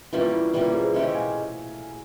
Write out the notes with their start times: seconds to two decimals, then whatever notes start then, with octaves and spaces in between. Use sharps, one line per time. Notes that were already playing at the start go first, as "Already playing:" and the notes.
0.13 E3 G3 A#3 C#4 F4
0.33 E4
0.54 E3 G3 A#3 C#4 F4
0.74 G#4 C5
0.94 G#3 C#4 G4 C5 E5
1.14 F5 G#5